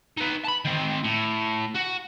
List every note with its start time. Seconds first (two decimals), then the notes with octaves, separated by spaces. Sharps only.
0.17 D#4 B4
0.44 A5 B5
0.65 D#3 C4
1.04 A2
1.75 F#4